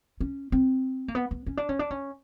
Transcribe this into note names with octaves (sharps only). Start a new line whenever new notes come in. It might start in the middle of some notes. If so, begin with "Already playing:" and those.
C#4
C4
A#3
B3
B3
C#4
D4
C#4
D4
C#4